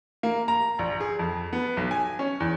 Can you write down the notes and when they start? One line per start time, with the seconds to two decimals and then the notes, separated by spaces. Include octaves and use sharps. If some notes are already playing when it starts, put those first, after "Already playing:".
0.23 A#3
0.48 A#5
0.79 A#1
1.00 G#4
1.19 F2
1.53 B3
1.77 B1
1.91 G#5
2.19 C#4
2.40 E2